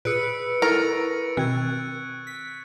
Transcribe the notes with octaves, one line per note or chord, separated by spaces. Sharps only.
A#2 G#4 B4 E6 C#7 D7
E4 A4 A#4 C#6 A6
B2 D#3 C4 F#6 G#6
B6